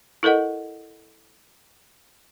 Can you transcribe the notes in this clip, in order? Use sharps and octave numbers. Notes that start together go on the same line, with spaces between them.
E4 A4 A#4 D#5 F#5